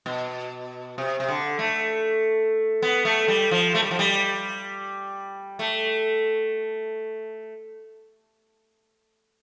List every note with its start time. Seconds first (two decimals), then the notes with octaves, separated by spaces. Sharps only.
0.06 B2
0.98 C3
1.20 C3
1.29 D3
1.59 A3
2.82 B3
3.05 A3
3.28 G3
3.51 F3
3.75 A3
3.83 G3
3.91 F3
3.99 G3
5.59 A3